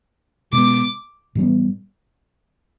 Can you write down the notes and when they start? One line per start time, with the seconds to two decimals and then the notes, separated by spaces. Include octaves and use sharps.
0.53 B2 G#3 B3 D6
1.35 A2 E3 G3 B3